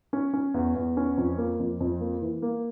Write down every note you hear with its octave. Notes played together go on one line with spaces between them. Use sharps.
C#4
C#4
E2
E2
C#4
F2
A#3
F2
F2
A#3
E3
A#3